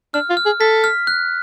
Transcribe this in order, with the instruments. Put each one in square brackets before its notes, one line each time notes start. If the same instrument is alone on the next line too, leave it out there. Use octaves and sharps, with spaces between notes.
[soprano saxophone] D4 [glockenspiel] F6
[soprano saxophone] F4
[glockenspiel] F6
[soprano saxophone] G#4
[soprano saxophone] A4 [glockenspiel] B6
[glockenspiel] F6
F#6